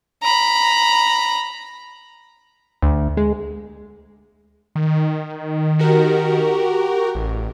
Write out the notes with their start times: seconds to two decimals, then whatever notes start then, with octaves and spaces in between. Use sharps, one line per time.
0.23 A#5 B5
2.82 D2
3.17 G#3
4.76 D#3
5.79 F#4 G4 A#4
7.15 A1